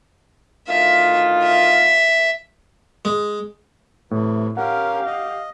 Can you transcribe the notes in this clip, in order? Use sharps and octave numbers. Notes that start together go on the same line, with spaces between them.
D2 D#3 F4 E5
E5
G#3
A2 C3 E3
C#4 G4 A#4 F5 F#5
D#5